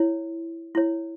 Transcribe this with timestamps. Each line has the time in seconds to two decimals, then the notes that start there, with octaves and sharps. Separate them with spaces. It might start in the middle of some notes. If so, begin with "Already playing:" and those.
Already playing: E4 C#5
0.75 E4 C#5